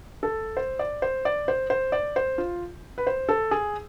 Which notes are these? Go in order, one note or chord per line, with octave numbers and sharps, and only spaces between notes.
A4
C5
D5
C5
D5
C5
C5
D5
C5
F4
B4
C5
A4
G#4